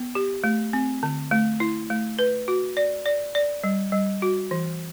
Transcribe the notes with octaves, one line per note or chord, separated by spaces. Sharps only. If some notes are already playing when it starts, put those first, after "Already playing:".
Already playing: B3
G4
A3
C4
D3
A3
E4
A3
B4
F#4
D5
D5
D5
G3
G3
F#4
E3